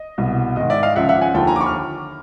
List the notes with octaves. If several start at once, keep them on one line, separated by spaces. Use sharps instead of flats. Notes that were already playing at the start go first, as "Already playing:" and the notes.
Already playing: D#5
C2 B2
G#2 D#3 D#5
D5 E5
D#5 F5
C#2 C#3 F3 E5 F#5
E5 F#5
F#5 G#5
D#2 D3 F3 G5 A5
G#5 A#5
D6
B5 C#6
F6